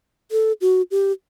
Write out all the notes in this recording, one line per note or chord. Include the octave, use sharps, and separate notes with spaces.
A4
F#4
G4